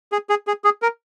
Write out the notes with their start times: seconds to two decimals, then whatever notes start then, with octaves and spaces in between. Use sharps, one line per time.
0.12 G#4
0.29 G#4
0.47 G#4
0.64 G#4
0.82 A#4